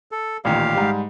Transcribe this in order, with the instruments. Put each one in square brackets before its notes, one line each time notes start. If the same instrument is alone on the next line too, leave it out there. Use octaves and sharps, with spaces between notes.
[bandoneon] A4
[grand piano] A1 A#2 D#3 [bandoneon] G4 F5
[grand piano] G#2 G3